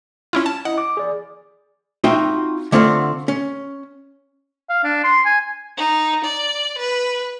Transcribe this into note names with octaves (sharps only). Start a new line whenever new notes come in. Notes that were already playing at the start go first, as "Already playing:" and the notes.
C#4 E4 F4
A5
E4 D#5 F#5
D6
G#4 D5
C4 D#4 F4 F#4 E5 G5
D3 A3 C4 F4 F5 F#5
C#4
F5
D4
C6
G#5
D#4
D5
B4